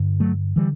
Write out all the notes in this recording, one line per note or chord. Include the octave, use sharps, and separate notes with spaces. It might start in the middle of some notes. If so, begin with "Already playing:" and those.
Already playing: G2 D3
F#3 A3
D3 E3 G3